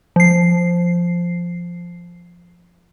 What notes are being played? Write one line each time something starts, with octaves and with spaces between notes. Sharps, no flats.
F3 C7